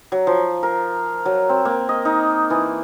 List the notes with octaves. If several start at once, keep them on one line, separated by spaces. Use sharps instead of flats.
F#3
F3
A#4
F#3
C4
A#3
D#5
D#4
E3